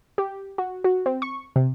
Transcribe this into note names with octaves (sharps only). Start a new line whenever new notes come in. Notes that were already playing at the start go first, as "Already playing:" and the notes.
G4
F#4
F#4
C4
C#6
C3